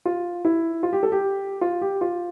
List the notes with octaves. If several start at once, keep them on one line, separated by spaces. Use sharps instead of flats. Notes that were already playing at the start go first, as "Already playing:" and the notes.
F4
E4
F4
G4
A4
G4
F4
G4
F4